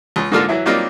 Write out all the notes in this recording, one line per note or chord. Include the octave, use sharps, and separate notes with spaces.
C#2
G#2 D3 A#3 F4 A4 F6
E3 F#3 E4
F#3 G3 A#3 C4 D#4 F4